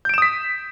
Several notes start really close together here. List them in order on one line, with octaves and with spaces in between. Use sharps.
G6 D7 E7 D#6 B6